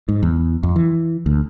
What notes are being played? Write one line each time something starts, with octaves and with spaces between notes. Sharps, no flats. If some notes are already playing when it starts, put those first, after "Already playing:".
G#2
E2
F2
E3
D2